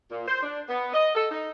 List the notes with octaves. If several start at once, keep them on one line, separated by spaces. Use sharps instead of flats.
A#2
C5
D4
B3
D#5
A4
D#4